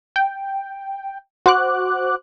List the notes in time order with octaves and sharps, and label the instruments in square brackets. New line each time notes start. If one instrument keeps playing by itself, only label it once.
[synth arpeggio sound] G5
F#4 C5 D6 F#6